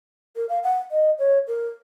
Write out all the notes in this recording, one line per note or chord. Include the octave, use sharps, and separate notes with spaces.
A#4
F5
F#5
D#5
C#5
A#4